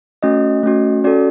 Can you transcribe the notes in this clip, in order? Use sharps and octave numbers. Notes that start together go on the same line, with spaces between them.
A3 C#4 F#4 D#5
A3 C#4 F#4
C#4 F#4 A4 D5